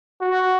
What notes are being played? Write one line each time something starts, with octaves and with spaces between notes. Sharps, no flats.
F#4